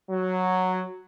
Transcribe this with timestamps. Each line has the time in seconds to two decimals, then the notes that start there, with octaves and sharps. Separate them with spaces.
0.10 F#3